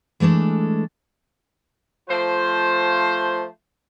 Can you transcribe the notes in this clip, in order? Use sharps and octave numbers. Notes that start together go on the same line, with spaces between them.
E3 G#3 A3 D4 A4
F3 A3 F4 C5